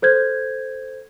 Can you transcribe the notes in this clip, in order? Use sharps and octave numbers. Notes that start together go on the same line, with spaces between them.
A4 C5 G6 G#6